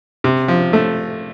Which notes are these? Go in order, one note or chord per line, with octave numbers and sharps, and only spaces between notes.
C3
F3
A3